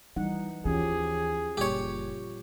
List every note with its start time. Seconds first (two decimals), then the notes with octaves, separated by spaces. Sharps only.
0.16 E3 G3 D#4 F#5
0.65 D#2 E3 F3 C#4 G4 G#4
1.57 F#1 A#2 G3 G4 C#5